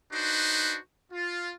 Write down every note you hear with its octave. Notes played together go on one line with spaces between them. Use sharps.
D4 D#4 F#4 B4 C5
F4